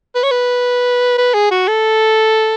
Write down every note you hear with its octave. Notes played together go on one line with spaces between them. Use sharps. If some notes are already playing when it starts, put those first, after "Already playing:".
B4
C#5
B4
B4
G#4
F#4
A4